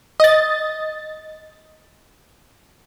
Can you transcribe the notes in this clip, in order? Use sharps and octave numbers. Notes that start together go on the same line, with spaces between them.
D#5 A6